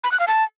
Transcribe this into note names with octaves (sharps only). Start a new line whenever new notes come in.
B5
F#6
F5
A5